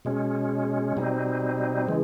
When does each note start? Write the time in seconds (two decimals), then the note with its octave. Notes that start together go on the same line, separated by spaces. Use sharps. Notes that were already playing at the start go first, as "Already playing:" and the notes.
0.05 B2 G#3 C#4
0.97 B2 G3 C4 D#4
1.87 C#3 E3 G#3